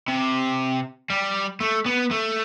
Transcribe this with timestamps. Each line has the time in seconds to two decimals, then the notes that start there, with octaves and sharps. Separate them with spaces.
0.08 C3
1.10 G3
1.60 A3
1.86 B3
2.11 A3